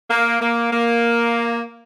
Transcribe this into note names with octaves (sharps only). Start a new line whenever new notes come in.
A#3
A#3
A#3